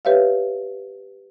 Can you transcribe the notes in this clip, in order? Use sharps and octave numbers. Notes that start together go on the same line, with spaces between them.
G4 B4 C#5 E5 F5